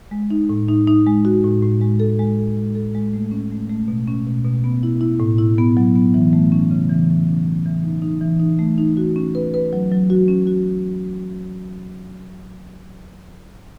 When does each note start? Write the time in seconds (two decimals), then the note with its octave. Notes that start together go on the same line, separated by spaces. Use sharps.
0.11 G#3
0.31 D#4
0.49 A2
0.68 D#4
0.87 D#4
1.06 G#3
1.25 F#4
1.44 A2
1.62 A2
1.81 G#3
2.00 A4
2.19 G#3
2.38 A4
2.57 G#3
2.75 A4
2.95 G#3
3.13 A3
3.31 C#4
3.51 A3
3.69 A3
3.88 B2
4.08 C#4
4.27 B2
4.45 B2
4.64 B3
4.83 E4
5.01 E4
5.20 A2
5.38 E4
5.58 B3
5.77 F#3
5.95 B3
6.14 E3
6.33 A3
6.52 C#4
6.71 C#3
6.89 E3
7.09 C#4
7.27 C#4
7.46 E3
7.66 E3
7.84 D#4
8.02 D#4
8.21 E3
8.40 D#4
8.59 A3
8.78 D#4
8.97 F#4
9.16 C#4
9.35 B4
9.54 B4
9.73 F#3
9.92 F#3
10.10 F#4
10.28 C#4
10.47 F#4